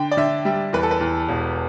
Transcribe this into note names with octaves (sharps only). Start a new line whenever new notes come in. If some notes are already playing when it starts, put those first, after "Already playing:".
Already playing: D3 G5
D5
D3 E5
G3 E5
E2 B4
A4
B4
E2
E1